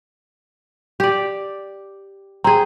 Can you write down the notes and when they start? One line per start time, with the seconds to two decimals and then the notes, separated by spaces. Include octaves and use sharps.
1.00 G4 D5
2.44 C4 G#4 A#5